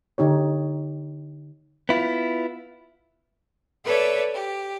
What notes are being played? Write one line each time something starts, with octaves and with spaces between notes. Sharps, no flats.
D3 D#4 G4 C#5
B3 E4 F4
A4 B4 C#5 D5 E5
G4